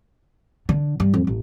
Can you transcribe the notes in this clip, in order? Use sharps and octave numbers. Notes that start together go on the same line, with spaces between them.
D3
G2
F2
A1